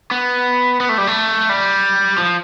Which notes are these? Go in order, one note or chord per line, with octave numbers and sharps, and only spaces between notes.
B3
B3
A3
G3
A3
G3
F3